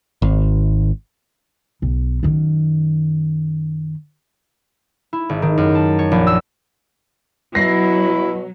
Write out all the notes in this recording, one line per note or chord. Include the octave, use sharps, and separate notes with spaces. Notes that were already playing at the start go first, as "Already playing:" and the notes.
G#1
B1
F#2 D#3
E4
G#1
D#3
F#2
A5
C#5
A#1
E6
B2 F#3 E4 A#6 C7